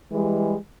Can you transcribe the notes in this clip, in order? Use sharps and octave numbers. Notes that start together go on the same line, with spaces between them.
E3 G3 G#3